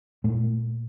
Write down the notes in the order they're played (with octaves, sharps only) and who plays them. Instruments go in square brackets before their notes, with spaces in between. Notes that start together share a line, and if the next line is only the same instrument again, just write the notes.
[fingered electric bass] A#2 A3